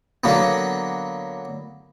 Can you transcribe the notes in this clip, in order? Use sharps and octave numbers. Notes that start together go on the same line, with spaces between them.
D3 F#3 A#3 B3